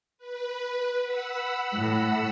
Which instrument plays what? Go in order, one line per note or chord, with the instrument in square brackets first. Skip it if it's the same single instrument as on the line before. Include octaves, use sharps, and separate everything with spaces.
[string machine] B4
F#5 B5 E6
[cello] A2